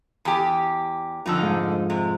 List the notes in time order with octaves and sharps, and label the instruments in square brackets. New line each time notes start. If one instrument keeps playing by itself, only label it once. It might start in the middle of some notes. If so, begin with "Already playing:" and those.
[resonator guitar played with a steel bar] E2 G4
[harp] F2 A5 E6 [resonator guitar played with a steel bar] D3 D#4
[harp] G#2 F5
[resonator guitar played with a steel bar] C3